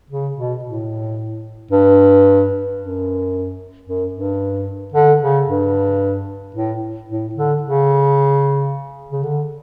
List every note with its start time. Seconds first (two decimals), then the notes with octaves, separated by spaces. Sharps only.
0.10 C#3
0.37 B2
0.64 A2
1.71 G2
2.79 F#2
3.86 F#2
4.13 G2
4.94 D3
5.21 C#3
5.47 G2
6.55 A2
7.09 A2
7.35 D3
7.62 C#3
9.12 C#3
9.23 D3